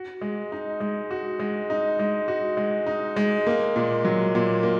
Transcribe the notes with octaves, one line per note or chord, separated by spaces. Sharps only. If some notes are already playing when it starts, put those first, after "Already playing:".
Already playing: F#4
G#3
D#4
G#3
F#4
G#3
D#4
G#3
F#4
G#3
D#4
G#3
A#3
A#2
F#3
A#2
A#3